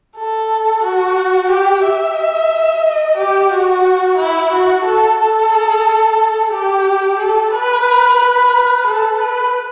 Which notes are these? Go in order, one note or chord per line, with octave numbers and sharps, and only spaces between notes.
A4
F#4
G4
E5
D#5
G4
F#4
E4
F#4
A4
A4
G4
A4
B4
B4
A4
B4